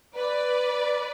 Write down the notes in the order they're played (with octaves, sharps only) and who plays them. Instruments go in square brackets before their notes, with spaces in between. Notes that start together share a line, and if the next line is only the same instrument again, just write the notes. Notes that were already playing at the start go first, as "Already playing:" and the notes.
[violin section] B4 D5